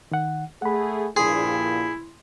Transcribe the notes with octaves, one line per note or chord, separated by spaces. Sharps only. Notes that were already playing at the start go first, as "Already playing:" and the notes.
D#3 F#5
A3 G#4 F#5 B5
A#1 G2 A#2 E4 G#4 C6